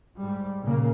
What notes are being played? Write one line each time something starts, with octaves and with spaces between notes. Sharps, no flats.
G#2 G3
A#2 C#3 A#3